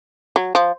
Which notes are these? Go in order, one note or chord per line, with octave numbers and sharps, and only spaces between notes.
F#3
F3